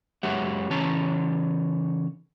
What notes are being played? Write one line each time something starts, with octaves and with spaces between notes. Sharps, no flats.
F#2 G#3 G4 C#5 E5 F#5
C#3 E3 C#4 C#5 A5 A#5